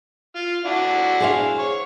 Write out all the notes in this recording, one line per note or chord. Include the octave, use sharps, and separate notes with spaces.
F4 F6
D4 E4 F#4
G#4 C5 F5
C#5